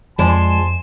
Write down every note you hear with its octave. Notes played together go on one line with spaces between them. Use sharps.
F2 F3 G#3 D5 G#5 A5 C6 E7